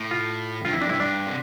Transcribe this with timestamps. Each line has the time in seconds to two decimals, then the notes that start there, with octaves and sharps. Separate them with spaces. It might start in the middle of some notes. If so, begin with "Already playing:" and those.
Already playing: A2
0.11 F4
0.64 G2 F4
0.73 F2 E4
0.81 D4
0.88 G2 E4
1.00 G2 D4
1.26 C3